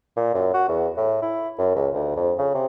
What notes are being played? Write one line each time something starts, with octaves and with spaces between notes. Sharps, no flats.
A#2
F#2
F#4
E2
A2
E4
F#2
C#2
D2
F2
C#3
C3